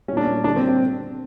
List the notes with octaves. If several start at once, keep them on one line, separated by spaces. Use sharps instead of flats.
A#2 G3 C#4 D4
C#4
D3 G3 D4
C4
C4